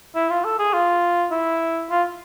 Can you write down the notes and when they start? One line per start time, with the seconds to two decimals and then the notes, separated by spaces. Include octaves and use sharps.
0.16 E4
0.30 F4
0.45 A4
0.59 G#4
0.74 F4
1.31 E4
1.90 F4